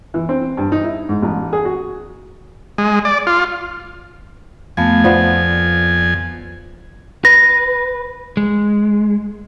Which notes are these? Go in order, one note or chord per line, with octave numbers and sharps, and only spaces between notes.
E3
C4
G2
D#4
E4
G#2
A1
G#4
F#4
G#3
D5
F4
F2 A3 B3 F5 G#5
F3 B3 D5
B4 A#6
G#3